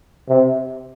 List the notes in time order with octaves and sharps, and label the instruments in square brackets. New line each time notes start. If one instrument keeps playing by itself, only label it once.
[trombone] C3